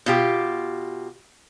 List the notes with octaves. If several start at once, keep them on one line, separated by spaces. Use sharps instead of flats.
B2 F4 G4